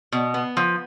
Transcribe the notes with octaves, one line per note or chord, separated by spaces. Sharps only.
B2
B3
F3